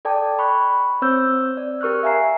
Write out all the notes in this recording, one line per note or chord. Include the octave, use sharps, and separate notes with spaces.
A4 D5 G5 A5 D6
B5 C#6 F#6
C4 C5 C#5 E6 G6
D5
G4 A#4 C#6 F6 F#6
E5 F5 G#5 A#5 C7